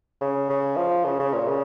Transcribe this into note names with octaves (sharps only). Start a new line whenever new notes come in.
C#3
C#3
F3
C#3
C#3
A#2
C#3